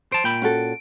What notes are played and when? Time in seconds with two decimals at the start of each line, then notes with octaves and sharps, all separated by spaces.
0.12 C5 A5 D7
0.24 A#2 G5 B5
0.42 C#4 F#4 A4